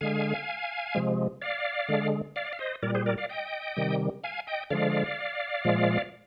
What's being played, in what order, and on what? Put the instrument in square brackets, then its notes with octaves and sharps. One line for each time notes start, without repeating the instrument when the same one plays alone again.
[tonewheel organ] D3 G#3 F5 G#5
C3 F3 G#3
D5 F5
D3 G#3
D5 F5
F5
C5 D#5
A#2 G3 A#4 D5
G#4 C5
A#4 D5
D5 F5
D#5 G5
C3 D#3 G3
F5 G#5
D#5 G5
D3 F3 G#3 D5 F5
A#2 F3 G#3